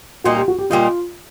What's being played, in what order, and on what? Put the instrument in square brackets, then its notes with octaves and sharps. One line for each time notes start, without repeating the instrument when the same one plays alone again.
[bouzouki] A#2 G3 A#3 D#4 [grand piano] F#4
[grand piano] G4
F#4
G4
[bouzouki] A#2 G3 A#3 D#4 [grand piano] F4